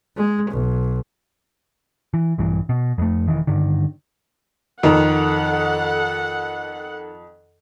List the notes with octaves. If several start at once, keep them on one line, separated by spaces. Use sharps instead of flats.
G#3
B1
E3
A#1 G2 E3
B2
F2 A3
E1 D#3 E3
G2 D3 D#3
F2 D#3 A4 F#5